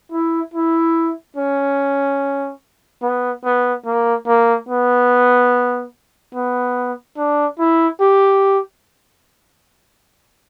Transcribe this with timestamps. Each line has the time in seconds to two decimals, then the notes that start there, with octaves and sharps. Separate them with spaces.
0.12 E4
0.54 E4
1.37 C#4
3.02 B3
3.45 B3
3.86 A#3
4.27 A#3
4.69 B3
6.35 B3
7.17 D4
7.59 E4
8.01 G4